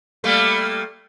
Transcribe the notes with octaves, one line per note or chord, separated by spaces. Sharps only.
G3 A3 A#3